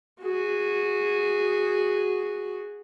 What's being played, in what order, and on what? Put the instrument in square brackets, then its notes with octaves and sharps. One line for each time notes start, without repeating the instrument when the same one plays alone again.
[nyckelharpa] F#4 G#4